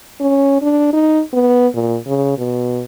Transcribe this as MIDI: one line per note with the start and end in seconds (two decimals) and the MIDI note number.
0.21 0.62 61
0.62 0.92 62
0.93 1.21 63
1.33 1.68 59
1.74 1.98 46
2.06 2.36 49
2.38 2.83 47